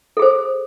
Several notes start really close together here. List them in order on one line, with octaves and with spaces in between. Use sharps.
A4 G#4 C5